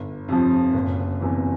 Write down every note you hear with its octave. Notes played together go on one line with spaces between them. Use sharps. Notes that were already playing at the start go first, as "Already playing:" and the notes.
Already playing: G1
F2 C3 F3
F#1
E2 C3 E3